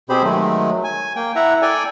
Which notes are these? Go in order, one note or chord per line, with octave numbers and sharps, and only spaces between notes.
B2 C4 G4 G#4 C5 B5
D#3 F#3 G#3 A3
G#5
A#3 G5
E4 E5 F#5 A#5
A4 D5 G5 G#5